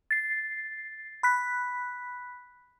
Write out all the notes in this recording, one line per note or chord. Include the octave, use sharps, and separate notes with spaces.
A6 C7
B5 F#6 B6